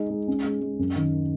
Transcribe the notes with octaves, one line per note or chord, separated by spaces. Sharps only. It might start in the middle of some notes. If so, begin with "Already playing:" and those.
Already playing: G#3 D#4
G#3
C#4
G#3
G#3
F#2
D#3